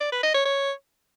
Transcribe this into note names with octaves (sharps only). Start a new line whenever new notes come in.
D5
B4
D#5
C#5
C#5